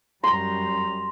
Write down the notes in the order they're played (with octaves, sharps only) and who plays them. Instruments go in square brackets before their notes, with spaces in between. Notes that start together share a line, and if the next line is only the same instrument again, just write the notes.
[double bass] F#2 G3 [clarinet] A#5 [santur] C6